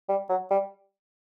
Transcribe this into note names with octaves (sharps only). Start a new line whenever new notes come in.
G3
F#3
G3